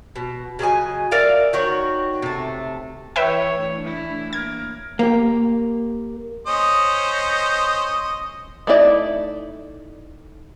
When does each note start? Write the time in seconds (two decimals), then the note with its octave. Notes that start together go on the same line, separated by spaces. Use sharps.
0.16 B2
0.59 C#3 F#3 D#5 G#5
1.11 A#4 D5 E5 F5
1.53 D#3 F#4 C#5
2.22 C3 A3
3.16 E3 E4 B4 C#5 E5 G5
3.52 E3 A3 D4
3.84 E4
4.33 A#3 A#4 G#6
4.99 A#3 G4
6.47 C#4 C5 D#5
8.67 A3 D#4 E4 A#4 D5